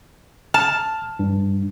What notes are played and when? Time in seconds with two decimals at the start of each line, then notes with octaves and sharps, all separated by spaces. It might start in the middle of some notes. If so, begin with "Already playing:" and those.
0.54 A5 F6
1.19 G2